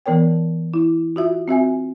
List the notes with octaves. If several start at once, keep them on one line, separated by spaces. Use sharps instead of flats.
E3 B3 A#4 C#5 G5
E4
F4 F#4 E5
C4 F#4 E5 G#5